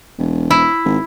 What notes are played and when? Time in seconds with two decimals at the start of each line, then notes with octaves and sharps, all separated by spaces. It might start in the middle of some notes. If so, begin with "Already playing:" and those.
0.18 E1
0.51 E4
0.85 G#1